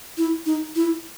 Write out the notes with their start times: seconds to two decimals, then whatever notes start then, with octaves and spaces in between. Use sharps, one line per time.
0.18 E4
0.46 D#4
0.76 E4